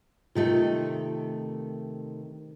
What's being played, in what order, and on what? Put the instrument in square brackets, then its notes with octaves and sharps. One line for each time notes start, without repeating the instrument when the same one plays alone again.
[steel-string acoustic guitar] C3 D#3 A3 [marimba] F4